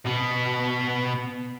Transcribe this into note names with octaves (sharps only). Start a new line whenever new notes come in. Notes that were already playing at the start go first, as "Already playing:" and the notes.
B2 B3